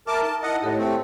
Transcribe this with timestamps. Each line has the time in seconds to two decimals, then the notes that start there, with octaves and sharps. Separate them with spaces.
0.07 A#4 E5 A5 D6
0.22 D#4 A5
0.43 E4 D#5 F#5 A5
0.62 A2 G4 A4 C#5
0.78 A3 C4